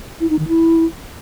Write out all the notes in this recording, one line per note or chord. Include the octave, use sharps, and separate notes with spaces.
E4
D#4
D#3
E4